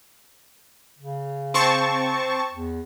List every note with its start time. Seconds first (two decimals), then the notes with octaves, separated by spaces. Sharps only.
0.99 C#3
1.54 C4 A5 C#6
2.51 E2